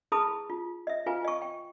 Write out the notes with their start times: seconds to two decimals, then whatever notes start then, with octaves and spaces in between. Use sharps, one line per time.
0.12 E4 G#4 B4 A5 B5 D#6
0.50 F4
0.87 D#5 E5
1.06 F4 B4 C5 F5 G#5
1.25 D#5 C#6
1.42 G5